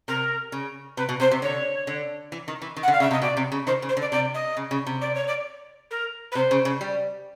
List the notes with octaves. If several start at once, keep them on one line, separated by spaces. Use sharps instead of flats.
C3 A#4
C#3
C3 B4
B2
C3 C5
C3
D3 C#5
D3
E3
D#3
E3
D#3
F#5
D3
F5
C#3 E5
C3 D#5
B2 D5
C3
C#3
D#3 C5
C#3
C5
D3
D5
C3 D5
D#5
C#3
C#3
C3
D5
C#5
D5
A#4
B4
C3 C5
C#3
C#3
G3